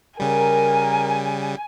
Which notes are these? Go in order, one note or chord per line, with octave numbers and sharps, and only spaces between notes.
C#3 G3 A#4 G#5